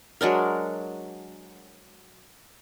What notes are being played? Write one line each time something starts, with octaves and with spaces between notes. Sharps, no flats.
F#3 G#3 D4 A#4